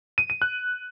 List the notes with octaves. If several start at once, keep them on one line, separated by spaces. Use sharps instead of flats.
D#7
D#7
F#6